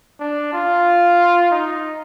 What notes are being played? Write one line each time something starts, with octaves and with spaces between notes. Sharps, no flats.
D4
F4
D#4